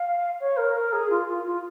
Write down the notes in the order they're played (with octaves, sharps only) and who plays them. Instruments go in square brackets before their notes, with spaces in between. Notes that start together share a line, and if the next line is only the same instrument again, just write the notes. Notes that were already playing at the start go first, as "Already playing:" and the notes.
Already playing: [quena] F5
C#5
A#4
A#4
G#4
F4
F4
F4